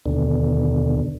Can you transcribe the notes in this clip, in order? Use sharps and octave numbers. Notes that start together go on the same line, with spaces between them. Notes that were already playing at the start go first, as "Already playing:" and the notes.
D#2 B2 D3